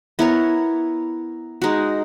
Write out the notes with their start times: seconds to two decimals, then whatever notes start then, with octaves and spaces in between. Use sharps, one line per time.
0.19 B3 E4 A#4 C#5
1.62 G#3 D#4 F#4